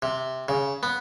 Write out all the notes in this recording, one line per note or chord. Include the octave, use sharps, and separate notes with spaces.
C3
C#3
B3